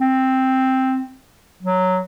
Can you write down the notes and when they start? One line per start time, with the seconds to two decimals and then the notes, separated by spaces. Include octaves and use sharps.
0.01 C4
1.63 F#3